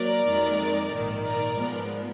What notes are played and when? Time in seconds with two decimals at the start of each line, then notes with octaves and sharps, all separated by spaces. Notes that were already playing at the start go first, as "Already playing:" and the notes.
Already playing: F#3 A#3 A#4 D5
0.26 F2 D#3 G#3
0.91 A#1 G#2 D#3
1.25 A#4 D5
1.57 G#2 F3 G#3 B3